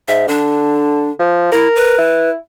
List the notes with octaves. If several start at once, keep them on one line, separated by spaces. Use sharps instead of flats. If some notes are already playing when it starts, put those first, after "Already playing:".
G#2 E5
D3 D4
F3
E4 A#4
B4
E4